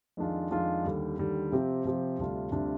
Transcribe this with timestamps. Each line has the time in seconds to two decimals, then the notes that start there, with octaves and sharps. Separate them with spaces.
0.17 F2 D#3 G#3 D4 F4
0.51 F2 D#3 G#3 D4 F4
0.84 D#2 D3 G3
1.19 D#2 D3 G3
1.52 C3 F3 C4 G4
1.85 C3 F3 C4 G4
2.19 D2 C3 G3 D4 F4
2.52 D2 C3 G3 D4 F4